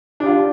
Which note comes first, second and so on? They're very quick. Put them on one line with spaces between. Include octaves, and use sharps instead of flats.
D4 G4 F4